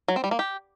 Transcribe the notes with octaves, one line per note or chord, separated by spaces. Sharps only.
F#3
C4
G3
A#3
G4